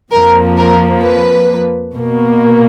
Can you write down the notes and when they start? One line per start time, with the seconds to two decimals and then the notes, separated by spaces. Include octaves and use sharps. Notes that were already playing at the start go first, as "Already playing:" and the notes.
0.11 F2 F3 A#3 A#4
0.57 A#4
1.02 B4
1.93 B2 A#3